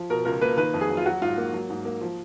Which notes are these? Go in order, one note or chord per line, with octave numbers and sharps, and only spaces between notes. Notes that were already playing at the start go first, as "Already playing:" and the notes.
Already playing: F3
B2 A#4
C#2 A#4
A#3 B4
D#3 B4
F2
G#4
F#3
F4
F#3 F#4
G#2 F4
A#3
F#3
G#2
A#3
F3